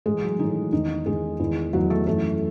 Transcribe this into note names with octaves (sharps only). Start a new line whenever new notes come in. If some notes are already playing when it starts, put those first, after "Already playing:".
A2 E3 G#3 G#4
F#3 F#4
A2 D#3 E3 D#4
E2 D#3 D#4
E2 D#3 G#3 G#4
E2 D#3
E2 D#3 F#3 F#4
A3 A4
F#2 E3 A3 A4